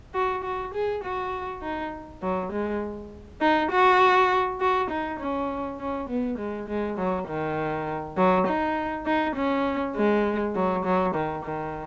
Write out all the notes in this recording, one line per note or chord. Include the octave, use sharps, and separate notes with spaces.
F#4
F#4
G#4
F#4
D#4
F#3
G#3
D#4
F#4
F#4
D#4
C#4
C#4
B3
G#3
G#3
F#3
D#3
F#3
D#4
D#4
C#4
G#3
F#3
F#3
D#3
D#3